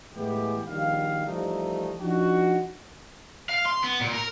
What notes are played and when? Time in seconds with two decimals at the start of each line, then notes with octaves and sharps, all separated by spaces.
0.14 A2 E3 G#3 B3 G4
0.66 A#1 D#3 G3 F5
1.26 E3 F3 G3 A3 D#4
2.00 F3 D4 D#4 F#4
3.49 F5
3.66 C6
3.83 B3
4.01 A#2
4.14 A#4